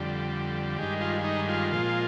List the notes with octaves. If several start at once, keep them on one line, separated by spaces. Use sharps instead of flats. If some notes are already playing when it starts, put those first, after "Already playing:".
Already playing: F2 D3 G3
G2 D#3 G#3 G4
F4
D#4
F4
A#2 F3 G#3